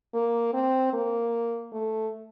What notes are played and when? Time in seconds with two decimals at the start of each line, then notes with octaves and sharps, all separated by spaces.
0.14 A#3
0.53 C4
0.93 A#3
1.73 A3